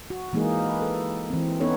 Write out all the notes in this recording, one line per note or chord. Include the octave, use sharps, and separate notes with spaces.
F#4
E3 G#3 A#3 D#4 G#4
B4
A4
E3 C4
B3 C#4 D#4 A4 B4 C#5